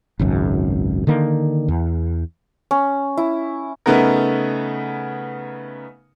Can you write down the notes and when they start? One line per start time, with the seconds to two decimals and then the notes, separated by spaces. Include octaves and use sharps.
0.19 G#1 C#2 F#2
1.07 D3 D#3 A#3
1.68 E2
2.71 C#4
3.17 E4
3.86 C#3 A3 B3 D#4 A#4